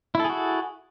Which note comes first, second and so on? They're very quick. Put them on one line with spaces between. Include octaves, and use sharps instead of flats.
E4 A4 G#4 F#4